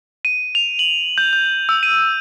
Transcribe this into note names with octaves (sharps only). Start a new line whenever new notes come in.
D#7
F7
F#7
G6
G6
E6
D#7